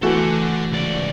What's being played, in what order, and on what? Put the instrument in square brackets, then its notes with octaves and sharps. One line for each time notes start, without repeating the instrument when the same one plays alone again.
[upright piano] E3 A3 F#4 [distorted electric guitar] A4 F#5
[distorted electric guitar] C#2 D5